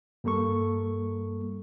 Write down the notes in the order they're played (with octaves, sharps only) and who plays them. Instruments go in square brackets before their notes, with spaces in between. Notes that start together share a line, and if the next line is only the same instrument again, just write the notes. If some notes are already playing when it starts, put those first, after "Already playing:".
[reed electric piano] G2 G3 A#3 A4 C#6